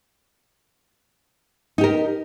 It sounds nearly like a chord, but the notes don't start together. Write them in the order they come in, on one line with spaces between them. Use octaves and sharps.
D#4 G4 A#4